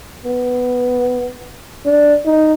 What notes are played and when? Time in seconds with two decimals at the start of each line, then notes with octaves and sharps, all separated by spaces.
0.25 B3
1.86 D4
2.26 D#4